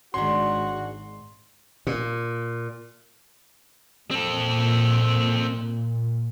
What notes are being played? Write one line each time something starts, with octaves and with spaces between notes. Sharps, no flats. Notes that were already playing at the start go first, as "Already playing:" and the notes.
G#1 G#3 C#4 D4 F#4 C6
A#2
A#2 C4 A4